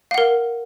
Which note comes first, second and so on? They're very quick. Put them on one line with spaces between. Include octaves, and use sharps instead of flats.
F5 F#5 A#4